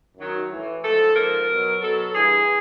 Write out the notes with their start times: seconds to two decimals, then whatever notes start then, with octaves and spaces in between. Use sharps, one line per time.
0.17 F#2 D#3 F#3
0.50 A2 E3
0.83 G#2 F3 A4
1.15 G#2 F3 A#4
1.48 B2 F#3
1.81 B2 F#3 A4
2.13 G2 E3 G#4